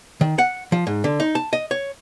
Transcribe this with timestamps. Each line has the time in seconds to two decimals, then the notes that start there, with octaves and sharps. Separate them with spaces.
0.21 D#3
0.38 F#5
0.72 F3
0.87 G#2
1.04 D3
1.20 D#4
1.35 A5
1.53 D#5
1.71 C#5